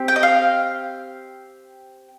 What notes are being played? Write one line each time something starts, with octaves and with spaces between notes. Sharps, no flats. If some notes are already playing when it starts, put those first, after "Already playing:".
Already playing: C4 G4
G5
D#5
F5